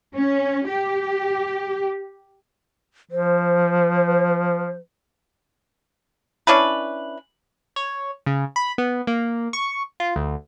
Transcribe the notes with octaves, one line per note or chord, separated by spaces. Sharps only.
C#4
G4
F3 C5
C#4 D4 E4 B4
C#5
C#3
B5
B3
A#3
C#6
F4
D2